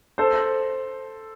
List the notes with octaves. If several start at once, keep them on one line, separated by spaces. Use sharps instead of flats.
A4 C5